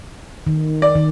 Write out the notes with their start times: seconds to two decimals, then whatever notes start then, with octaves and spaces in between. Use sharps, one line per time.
0.47 D#3
0.82 D5
0.95 D#3